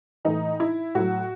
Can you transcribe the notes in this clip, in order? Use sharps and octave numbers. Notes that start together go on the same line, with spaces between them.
A2 E3 D#4
E4
A2 F#3 F#4